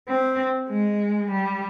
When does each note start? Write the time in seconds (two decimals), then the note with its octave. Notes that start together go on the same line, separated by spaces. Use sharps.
0.08 C4
0.70 G#3
1.31 G3